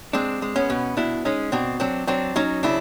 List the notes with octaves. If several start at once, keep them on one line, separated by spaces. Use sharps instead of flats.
G#3 C4 D4
G#3
B3 C#4
B2
B2 D4 E4
G#3 C#4 D#4
B2 C4 D4
F#3 C4 D4
F#3 C4 D4
F#3 C#4 D#4
C#3 D4 E4